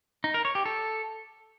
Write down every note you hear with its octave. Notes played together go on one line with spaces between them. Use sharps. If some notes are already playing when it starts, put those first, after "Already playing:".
D#4
A#4
C#5
G4
A4